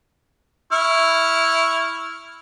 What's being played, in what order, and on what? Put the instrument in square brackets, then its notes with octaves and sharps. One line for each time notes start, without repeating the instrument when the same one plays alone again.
[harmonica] E4 C#6 F6